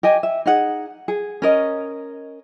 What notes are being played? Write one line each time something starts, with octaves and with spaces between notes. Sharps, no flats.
G4 D#5 G#5
E5
D#4 G#4 F#5
G#4
C#4 A#4 D#5